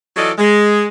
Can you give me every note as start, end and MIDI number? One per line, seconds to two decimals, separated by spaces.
0.17 0.31 52
0.17 0.31 54
0.17 0.31 65
0.17 0.31 69
0.17 0.31 74
0.17 0.31 75
0.38 0.87 56